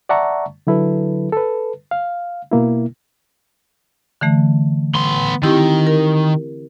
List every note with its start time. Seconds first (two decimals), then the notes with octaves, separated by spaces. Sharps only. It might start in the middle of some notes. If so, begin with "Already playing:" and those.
0.09 D5 E5 F#5 A5 A#5 C#6
0.67 D3 F#3 E4 A4 B4
1.33 A4 B4
1.91 F5
2.51 B2 A#3 E4
4.21 D3 E3 A3
4.95 B3 C6
5.43 D#3 C4 E4 G4
5.87 A#4